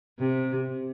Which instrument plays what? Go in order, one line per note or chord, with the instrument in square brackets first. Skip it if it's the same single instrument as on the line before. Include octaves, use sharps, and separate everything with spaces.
[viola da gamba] C3